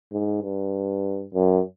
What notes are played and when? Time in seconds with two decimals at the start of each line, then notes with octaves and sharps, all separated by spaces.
0.12 G#2
0.42 G2
1.34 F#2